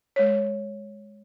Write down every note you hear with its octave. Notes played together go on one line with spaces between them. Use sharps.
G#3 C#5